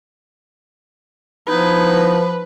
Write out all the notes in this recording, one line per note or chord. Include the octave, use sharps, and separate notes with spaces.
F3 B3 D#4 E4 B4